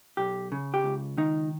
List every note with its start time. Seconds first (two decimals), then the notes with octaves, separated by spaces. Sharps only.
0.17 B1 G4
0.52 C#3
0.74 G4
0.84 C#2
1.18 D#3 D#4